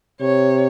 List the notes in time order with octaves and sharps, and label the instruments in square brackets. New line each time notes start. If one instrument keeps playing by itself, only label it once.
[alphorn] C3 [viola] C#5